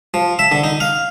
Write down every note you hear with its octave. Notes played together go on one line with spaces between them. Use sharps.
F3
E5
D3
D#4
F5